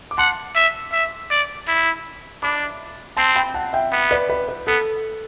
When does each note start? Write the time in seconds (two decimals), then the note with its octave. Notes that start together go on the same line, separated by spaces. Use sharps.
0.11 D6
0.18 F#5 A5 C6
0.55 E5
0.93 E5
1.30 D5
1.68 E4
2.43 D4 B5 D6
3.17 C4 A5 C6
3.35 G5 B5
3.54 F#5 A5
3.73 E5 G5
3.93 B3
4.11 B4 D5
4.30 B4
4.49 B4
4.67 B3 A4